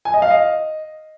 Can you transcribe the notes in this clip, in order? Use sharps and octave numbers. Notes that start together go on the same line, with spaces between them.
G#5
D#5
F5
D#5